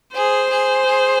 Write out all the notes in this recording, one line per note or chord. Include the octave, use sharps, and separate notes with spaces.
G#4 C5
G#4
G#4